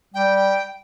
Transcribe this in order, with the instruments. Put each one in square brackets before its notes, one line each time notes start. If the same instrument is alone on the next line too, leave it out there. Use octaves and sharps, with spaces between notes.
[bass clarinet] G3 [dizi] G5